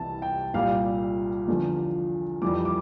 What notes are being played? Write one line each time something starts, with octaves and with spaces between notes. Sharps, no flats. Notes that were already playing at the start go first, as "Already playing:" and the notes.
Already playing: C2 C3 E3 G3 A5
G5
C2 A#2 G3 F5
E2 D3 F3
F2 E3 G3 D6
D6